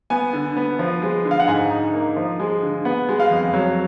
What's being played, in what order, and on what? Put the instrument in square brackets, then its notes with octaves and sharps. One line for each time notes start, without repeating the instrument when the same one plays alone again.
[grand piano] B3 G#5
D3
B3
F3
G#3
D3
F5
F#5
G#2 G#5
D#4
A#3
F3
G#3
D3
B3 F#5
G#3
F5
F2
F#3